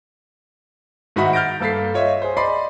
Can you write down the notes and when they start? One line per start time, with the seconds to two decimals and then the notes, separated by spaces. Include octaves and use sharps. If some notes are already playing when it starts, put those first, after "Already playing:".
1.16 G#2 D#3 F#4 E5 F#5 B5
1.33 F6 G6 A6 A#6 D7
1.60 G2 A#3 A4 A6 B6 C7
1.94 F4 C#5 D#5 E5
2.22 G#4 C5
2.37 D5 D#5 B5 C6 C7